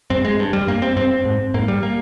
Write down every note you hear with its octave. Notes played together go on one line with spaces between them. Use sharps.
G2 C4
G#3
G2
G3
G2 A#3
C4
G2 C4
G#2
G#2 A#3
G3
A#3